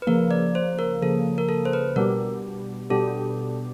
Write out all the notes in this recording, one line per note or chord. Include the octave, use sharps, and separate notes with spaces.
B4
C#3 F3 A#3 A#4
D5
C5
A#4
C#3 F3 A#3 A4
A#4
A4
C5
B4
B2 G3 B3 D4 G4 A#4
B2 G3 B3 D4 G4 A4